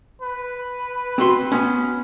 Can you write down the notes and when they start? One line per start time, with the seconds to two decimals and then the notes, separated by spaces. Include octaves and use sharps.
0.22 B4
1.18 C4 F#4 C6
1.52 B3 C#4